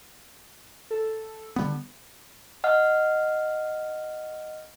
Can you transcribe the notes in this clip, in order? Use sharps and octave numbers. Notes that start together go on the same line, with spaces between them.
A4
D3 G3 B3
D#5 F#5 F6